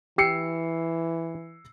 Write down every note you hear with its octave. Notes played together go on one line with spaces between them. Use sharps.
E3 G4 E6 C7 C#7